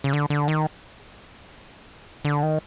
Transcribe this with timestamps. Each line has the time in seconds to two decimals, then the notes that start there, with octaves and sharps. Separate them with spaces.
0.04 C#3
0.13 D3
0.30 D3
0.48 D#3
2.25 D3
2.43 D#3